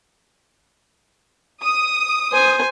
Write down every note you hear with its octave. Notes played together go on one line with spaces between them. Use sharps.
D#6
C5 G#5